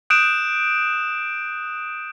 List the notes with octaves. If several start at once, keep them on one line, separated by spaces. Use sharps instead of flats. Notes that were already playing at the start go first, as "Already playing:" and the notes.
D#6 F#6 G6 D7 E7